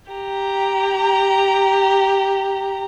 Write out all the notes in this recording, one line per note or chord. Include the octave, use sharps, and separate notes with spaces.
G4 A#5